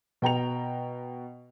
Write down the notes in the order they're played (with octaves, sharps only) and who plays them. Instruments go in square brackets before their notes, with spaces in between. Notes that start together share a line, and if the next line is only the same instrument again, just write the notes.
[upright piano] B2 G5 A#5 F7